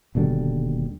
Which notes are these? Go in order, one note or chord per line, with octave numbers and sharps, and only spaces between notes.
D#1 B2 D3 G3